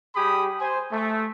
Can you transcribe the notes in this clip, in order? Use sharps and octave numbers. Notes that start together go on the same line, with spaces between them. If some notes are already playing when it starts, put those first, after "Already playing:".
G3 G4 G#4 B5 D#6
C5 G#5
A3